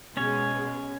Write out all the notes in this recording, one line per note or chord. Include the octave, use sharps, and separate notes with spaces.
B2 G#3 C#4 C#5